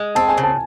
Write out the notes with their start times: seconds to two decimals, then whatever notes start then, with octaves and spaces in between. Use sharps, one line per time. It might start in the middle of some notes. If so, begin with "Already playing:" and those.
Already playing: G#3
0.15 C4 A5
0.29 G#5
0.38 C#3
0.43 A5